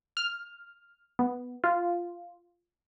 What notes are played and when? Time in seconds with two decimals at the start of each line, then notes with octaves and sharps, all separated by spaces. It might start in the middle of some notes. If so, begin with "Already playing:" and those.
0.17 F6
1.19 B3
1.64 F4